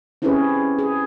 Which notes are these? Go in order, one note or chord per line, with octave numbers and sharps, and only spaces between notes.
C4 C#4 E4 G4 G#4 B4
G#4